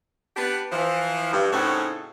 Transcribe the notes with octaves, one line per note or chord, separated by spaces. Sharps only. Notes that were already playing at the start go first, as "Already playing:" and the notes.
B3 D4 G4 B4
E3 F3
G2
A2 C#3 C4 C#4 D#4 F#4